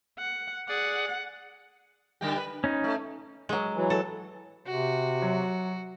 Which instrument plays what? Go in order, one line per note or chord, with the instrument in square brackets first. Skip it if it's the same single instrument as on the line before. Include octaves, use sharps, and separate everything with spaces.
[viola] F#5
[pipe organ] G#4 D5 [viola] F#5
[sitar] D3 G3 G4
B4
[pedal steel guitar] C#4 D#4
[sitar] A3
[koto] F#3 G#3
[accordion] E3 F#3
[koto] A4
[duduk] C3 [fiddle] F#4
[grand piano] F#3